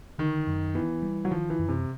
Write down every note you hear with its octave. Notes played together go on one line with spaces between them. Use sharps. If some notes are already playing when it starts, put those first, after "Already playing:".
D3 D#3
F#2
E3 B3
G3
F#3
D#3 F3
E3
F#2
C3